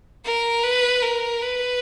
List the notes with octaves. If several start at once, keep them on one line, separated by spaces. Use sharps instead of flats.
A#4
B4
A#4
B4